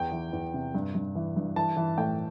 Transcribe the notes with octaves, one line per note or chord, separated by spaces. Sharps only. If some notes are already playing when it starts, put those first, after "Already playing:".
Already playing: E2 G5
E3
E2
C3
G2
G2
E3
G2
E3 A5
E3
A2 G5